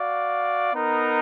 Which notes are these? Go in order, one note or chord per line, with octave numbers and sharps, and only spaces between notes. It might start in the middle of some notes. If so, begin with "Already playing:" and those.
Already playing: F#4 D5 F5
B3 D#4 A#4